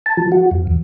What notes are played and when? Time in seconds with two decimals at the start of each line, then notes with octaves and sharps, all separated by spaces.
0.06 A5
0.17 F3
0.32 F#4
0.51 F2
0.67 E2